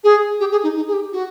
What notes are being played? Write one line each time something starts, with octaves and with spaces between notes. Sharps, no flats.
G#4
G4
G#4
D#4
D#4
G#4
G4
F#4